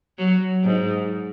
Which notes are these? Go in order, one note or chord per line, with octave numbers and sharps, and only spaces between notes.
F#3
G#2